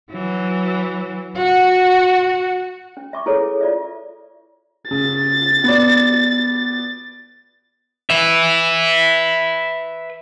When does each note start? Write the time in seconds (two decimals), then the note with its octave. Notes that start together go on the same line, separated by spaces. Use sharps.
0.11 E3 F#3
1.36 F#4 F#5
2.97 C#4
3.13 E5 C#6 D6
3.26 E4 G#4 A4 B4 C#5
3.61 F4 D5 E5
4.91 C#3 A6
5.64 B3 D5
8.10 B4 E5